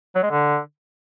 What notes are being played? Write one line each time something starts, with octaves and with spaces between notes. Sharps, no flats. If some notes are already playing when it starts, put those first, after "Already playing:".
F#3
G#3
D3